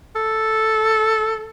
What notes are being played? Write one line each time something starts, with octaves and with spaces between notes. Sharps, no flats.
A4